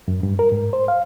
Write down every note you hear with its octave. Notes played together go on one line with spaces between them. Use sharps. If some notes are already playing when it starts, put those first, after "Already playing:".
F#2
G2
A#4
G#2
C5
F5